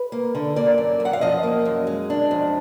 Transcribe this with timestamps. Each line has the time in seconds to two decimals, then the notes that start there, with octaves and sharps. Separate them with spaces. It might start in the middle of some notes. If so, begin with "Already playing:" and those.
Already playing: B4
0.12 A#3
0.35 D3
0.56 A#3 D5
0.78 F#2
1.00 F#2
1.05 F#5
1.13 F5
1.21 F3 D#5
1.43 A#3
1.65 F#2
1.87 G#3
2.10 D4
2.31 F2